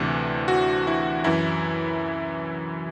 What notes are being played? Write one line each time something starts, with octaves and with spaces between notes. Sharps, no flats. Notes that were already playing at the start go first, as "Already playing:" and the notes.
Already playing: D2 C3 E3 D4
F#4
E4
F#2 E3 E4